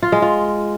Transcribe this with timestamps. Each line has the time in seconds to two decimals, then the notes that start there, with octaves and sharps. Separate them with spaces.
0.03 F4
0.12 G#3
0.22 F4